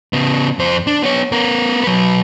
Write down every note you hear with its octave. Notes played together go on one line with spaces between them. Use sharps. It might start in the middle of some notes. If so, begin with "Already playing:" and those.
C#3 B3
F2 C5
D4
B3 C#5
B3 A#4
F#3 B4